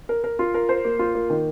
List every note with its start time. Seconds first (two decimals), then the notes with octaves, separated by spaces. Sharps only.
0.09 A#4
0.24 A#4
0.39 F4
0.54 A#4
0.69 C5
0.85 A#3
0.99 F4
1.15 A#3
1.30 D#3